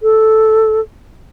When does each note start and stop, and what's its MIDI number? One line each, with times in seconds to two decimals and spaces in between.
0.03 0.80 69